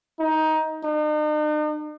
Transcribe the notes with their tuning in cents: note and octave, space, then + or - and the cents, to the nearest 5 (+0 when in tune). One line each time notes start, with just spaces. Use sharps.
D#4 +15
D#4 -45